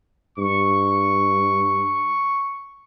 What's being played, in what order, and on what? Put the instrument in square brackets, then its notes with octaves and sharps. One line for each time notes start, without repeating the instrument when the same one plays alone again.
[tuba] G2 [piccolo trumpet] C#6